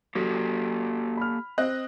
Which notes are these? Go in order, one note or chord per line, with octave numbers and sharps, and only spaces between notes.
F#3 A#3 G4 A4
B5 F6
C4 D#5 F#6